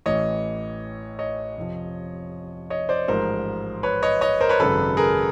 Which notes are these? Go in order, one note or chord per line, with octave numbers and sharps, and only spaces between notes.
A1 A2 E3 C#5 D#5
C#5 D#5
F2 C3 F3
C#5 D#5
C5 D5
A1 G#2 F3 A#4 C5
B4 C#5
C#5 D#5
C#5 D#5
A#4 C5
B4 C#5
G#1 F#2 C#3 A4 B4
G#4 A#4